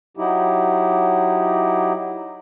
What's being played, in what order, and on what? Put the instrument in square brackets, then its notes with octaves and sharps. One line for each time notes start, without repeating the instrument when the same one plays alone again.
[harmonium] F#3 D#4 E4 G4